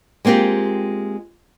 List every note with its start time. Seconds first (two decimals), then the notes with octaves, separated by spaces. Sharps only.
0.25 G#3 A#3 C4 F4 G4